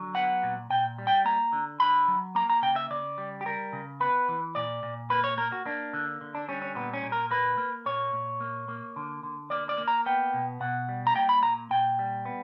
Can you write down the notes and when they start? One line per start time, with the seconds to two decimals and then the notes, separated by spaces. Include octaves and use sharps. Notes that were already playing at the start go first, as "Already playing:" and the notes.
Already playing: D3 F#3
0.15 B3 F#5
0.43 A#2
0.70 A#2 G5
0.98 G3
1.07 G5
1.25 A#3 A#5
1.53 D3
1.80 D3 B5
2.08 F#3
2.35 A#3 A#5
2.50 A#5
2.62 C#3 G5
2.76 E5
2.91 C#3 D5
3.18 G3
3.41 G4
3.46 G3 A#4
3.73 C#3
4.00 B3 B4
4.29 E3
4.55 A#2 D5
4.83 A#2
5.10 A#3 B4
5.24 C#5
5.37 A#3 A#4
5.52 F#4
5.66 A#3 D4
5.93 D3
6.21 D3
6.35 D4
6.48 G3 C#4
6.62 C#4
6.75 A#2 B3
6.93 C#4
7.03 A#2
7.12 A#4
7.31 A#3 B4
7.58 A#3
7.86 A#2 C#5
8.13 A#2
8.41 A#3
8.68 A#3
8.96 D3
9.23 D3
9.50 A#3 D5
9.69 D5
9.78 A#3
9.88 A#5
10.06 B3 G5
10.34 B2
10.60 B2 F#5
10.89 G3
11.07 A#5
11.15 A#3 G5
11.29 B5
11.43 A#2 A#5
11.71 A#2 G5
11.99 G3
12.25 B3